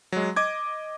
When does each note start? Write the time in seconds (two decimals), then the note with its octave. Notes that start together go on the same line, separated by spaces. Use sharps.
0.12 F#3 G#3
0.36 D#5 D6 G#6